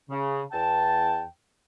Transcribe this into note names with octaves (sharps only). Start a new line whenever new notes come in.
C#3
E2 G5 A5